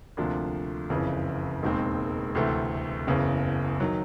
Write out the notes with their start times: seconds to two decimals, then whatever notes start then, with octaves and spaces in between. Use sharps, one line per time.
0.17 D2 C3 F3 A#3 D4
0.90 F#1 F2 C#3 E3
1.62 E1 D#2 D#3 G#3 C4
2.35 D2 C3 E3 A3 C4
3.07 F#1 E2 C#3
3.80 D#3 F#3